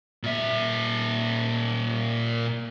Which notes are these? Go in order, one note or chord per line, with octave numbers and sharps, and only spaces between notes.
A#2 E5